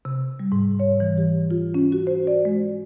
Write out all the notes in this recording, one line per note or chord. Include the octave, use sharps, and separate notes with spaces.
C3
G3
G#2
C#5
E3
G4
F4
C#4
F#4
C5
D5
G#3